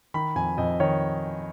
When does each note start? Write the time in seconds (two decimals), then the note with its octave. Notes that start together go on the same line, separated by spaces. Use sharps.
0.14 D#3 B5
0.35 F2 G#5
0.58 F2 D#5
0.80 D#3 C#5